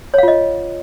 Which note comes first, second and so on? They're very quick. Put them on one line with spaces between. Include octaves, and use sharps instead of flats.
C#5 F5 F4 D#5